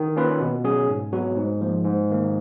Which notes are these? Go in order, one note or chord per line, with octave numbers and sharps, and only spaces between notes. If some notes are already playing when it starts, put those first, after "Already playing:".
Already playing: D#3
A#3 C#4 F4 B4
B2
F#3 C#4 G#4
G#2
F#3 B3 F#4
G#2
F3 A#3
G#2
D#3 A#3